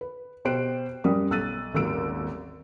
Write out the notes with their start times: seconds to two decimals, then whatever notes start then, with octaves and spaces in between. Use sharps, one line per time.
0.01 B4
0.45 B2 G4 C5 F#6 D7
1.04 F#2 G3 C#4 A#4 D#6
1.31 B1 E6 F#6 A6 D#7
1.73 D#1 G#1 D#2 F#3 E6 D7